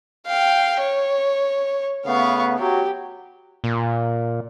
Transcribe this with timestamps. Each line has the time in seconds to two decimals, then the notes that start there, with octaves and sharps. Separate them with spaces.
0.26 F5 G5
0.80 C#5
2.05 C#3 A3 B3 F5 C#6
2.59 F#3 G4
3.64 A#2